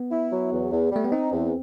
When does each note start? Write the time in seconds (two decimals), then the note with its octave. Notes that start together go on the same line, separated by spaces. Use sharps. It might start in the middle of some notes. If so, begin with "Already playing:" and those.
Already playing: B3
0.11 E4
0.31 F#3
0.52 E2
0.71 E2
0.91 G3 A3
1.04 B3
1.12 C4 D#4
1.32 E2